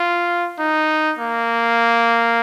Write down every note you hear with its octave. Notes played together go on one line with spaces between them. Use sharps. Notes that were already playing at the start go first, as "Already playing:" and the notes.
Already playing: F4
D#4
A#3